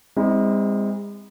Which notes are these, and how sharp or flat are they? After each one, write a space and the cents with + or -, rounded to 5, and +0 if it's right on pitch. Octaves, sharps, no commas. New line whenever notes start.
G#3 -40 C4 -10 D#4 +45